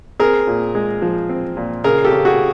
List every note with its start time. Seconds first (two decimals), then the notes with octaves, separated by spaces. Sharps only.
0.20 C4 G#4 A#4
0.47 A#2
0.75 G#3
1.02 F3
1.29 C4
1.57 A#2
1.84 C#3 G#4 A#4
2.05 G4 A4
2.12 C#3
2.25 F#4 G#4